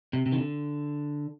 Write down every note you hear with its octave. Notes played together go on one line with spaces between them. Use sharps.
C3
C3
D#3
D3